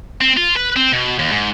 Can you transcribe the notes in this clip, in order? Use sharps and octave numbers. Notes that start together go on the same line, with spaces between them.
C4
F4
B4
C4
B2
D#2
G#2